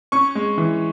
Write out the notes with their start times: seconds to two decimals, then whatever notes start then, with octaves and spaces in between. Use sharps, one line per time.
0.12 C#4 C#6
0.35 G#3
0.58 E3